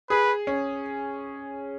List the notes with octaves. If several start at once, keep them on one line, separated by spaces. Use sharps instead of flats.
G#4 B4
C#4